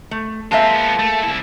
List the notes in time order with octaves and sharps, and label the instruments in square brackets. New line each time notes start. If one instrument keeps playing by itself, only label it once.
[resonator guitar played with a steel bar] A3
[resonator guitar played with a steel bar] G#3 A#3 E5 [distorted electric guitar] C4 F4 [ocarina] A5
[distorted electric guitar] F3 B3
A3
C2 E4